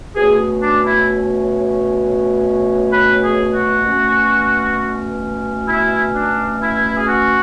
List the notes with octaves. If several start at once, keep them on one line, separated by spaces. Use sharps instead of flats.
B2 A3 C#4 G#4
D4
E4
B4
G#4
F#4
B2 A3 C#4
E4
D4
E4
G#4
F#4